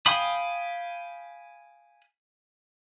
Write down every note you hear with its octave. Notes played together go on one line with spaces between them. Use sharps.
F5 G5 G#5 B5 D#6